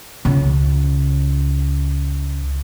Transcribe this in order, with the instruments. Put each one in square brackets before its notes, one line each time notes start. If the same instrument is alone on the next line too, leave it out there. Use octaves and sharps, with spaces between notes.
[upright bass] C#2 C#3